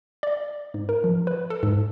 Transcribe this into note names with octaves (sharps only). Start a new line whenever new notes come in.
D5
G#2
A#4
F3
B4
A4
G#2